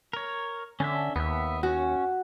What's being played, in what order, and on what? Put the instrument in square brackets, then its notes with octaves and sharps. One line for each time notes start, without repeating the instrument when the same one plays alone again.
[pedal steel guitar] A#4 C#5
[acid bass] D3 [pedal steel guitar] C#4 D4 E5
[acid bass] D#2 [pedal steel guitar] B3 E5
[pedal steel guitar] C#4 [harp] F#4